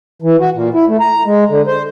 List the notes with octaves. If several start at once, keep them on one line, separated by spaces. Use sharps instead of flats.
E3
F#4
A#2
E4
A3
A#5
G#3
D3
C5